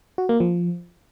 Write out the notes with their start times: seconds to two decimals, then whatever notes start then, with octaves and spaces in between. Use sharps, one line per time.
0.18 F#4
0.29 A#3
0.40 F3